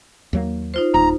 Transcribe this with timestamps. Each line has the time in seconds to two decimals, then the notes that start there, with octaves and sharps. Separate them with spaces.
0.33 D#2 F#3 A#3
0.74 D#4 F4 C5
0.94 D1 D#4 A#5